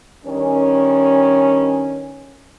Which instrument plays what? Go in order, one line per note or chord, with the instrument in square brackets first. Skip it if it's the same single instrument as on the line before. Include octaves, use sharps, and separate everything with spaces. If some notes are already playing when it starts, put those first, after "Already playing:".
[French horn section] G2 D#3 C#4